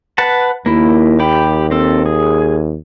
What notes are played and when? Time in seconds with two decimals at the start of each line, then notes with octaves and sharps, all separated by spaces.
0.18 B4 F#5 A5
0.66 D#2 A#3 E4
1.20 G4 G5 B5
1.71 C4 A4
2.06 G#4